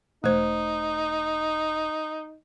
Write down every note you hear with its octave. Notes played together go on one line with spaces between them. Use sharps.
E1 A3 D#4 C5